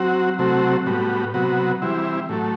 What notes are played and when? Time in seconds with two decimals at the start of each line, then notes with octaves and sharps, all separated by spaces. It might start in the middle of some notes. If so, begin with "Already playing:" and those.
Already playing: F#3 C4 F#4
0.38 C3 F#3 A3 C4 F#4
0.86 A2 G3 B3 F#4
1.34 C3 F#3 B3 F#4
1.82 E3 G3 C4 E4
2.29 A2 F#3 A3